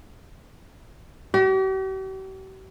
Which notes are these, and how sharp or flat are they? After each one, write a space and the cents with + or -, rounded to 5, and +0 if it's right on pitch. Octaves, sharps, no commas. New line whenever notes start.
G4 -45